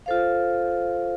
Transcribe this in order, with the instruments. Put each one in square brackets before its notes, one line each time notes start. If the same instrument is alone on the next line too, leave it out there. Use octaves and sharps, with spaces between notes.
[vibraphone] F4 A4 C5 F5